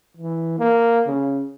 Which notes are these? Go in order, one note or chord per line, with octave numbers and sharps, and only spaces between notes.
E3
A#3
C#3